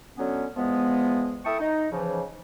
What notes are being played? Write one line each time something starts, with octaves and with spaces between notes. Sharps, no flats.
D3 F#3 B3 C#4
E2 F3 G#3 B3
E4 A4 G5 A5 C#6 D#6
D#4
C#3 E3 F3